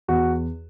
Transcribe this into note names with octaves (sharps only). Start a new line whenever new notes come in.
E2 F#4